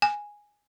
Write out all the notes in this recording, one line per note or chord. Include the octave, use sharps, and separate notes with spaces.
G#5